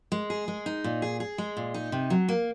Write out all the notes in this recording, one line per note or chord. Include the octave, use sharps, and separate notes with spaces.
G#3
G#4
G#3
D#4
A#2
G#4
G#4
G#3
A#2
D#4
C3
F#3
A#3